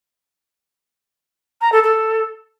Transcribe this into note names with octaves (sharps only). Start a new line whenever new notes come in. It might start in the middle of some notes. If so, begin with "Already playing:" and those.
A#5
A4
A4